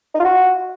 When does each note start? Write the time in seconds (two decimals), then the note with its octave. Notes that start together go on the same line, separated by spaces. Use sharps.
0.15 D#4
0.20 F4
0.25 F#4